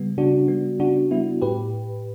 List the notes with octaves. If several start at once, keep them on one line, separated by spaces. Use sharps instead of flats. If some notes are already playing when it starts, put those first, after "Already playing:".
Already playing: C#3 G3 B3
C#3 D4 F#4
G3 B3
C#3 D4 F#4
G3 B3 E4
A2 G4 B4